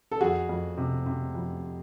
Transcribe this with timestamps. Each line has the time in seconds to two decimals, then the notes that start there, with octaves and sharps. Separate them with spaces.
0.11 A4
0.21 F2 F#4 G#4
0.49 F2
0.78 C3
1.06 C3
1.35 F2